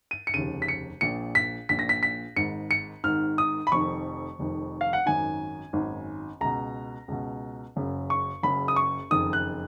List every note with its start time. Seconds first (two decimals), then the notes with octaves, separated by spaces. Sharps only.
0.11 D#7
0.27 C#7
0.34 F1 D#2 C#3 D#7
0.62 B6
0.68 C#7
1.01 A#1 A#2 C#7
1.35 B6
1.69 A#1 A#2 B6
1.79 A#6
1.89 B6
2.03 B6
2.36 G#1 G#2 D#3 C#7
2.71 C#7
3.04 G#1 G#2 D#3 F6
3.38 D#6
3.67 B5
3.72 F1 F2 D#3 C#6
4.39 F1 F2 D#3
4.81 F5
4.93 F#5
5.06 G#1 F#2 D#3 G#5
5.73 G#1 F#2 D#3
6.41 C#2 B2 A#5
7.08 C#2 B2
7.76 F#1 F#2 C#3
8.10 C#6
8.43 F#1 F#2 C#3 B5
8.68 D#6
8.76 C#6
9.11 F#1 F2 D#3 D#6
9.33 F#6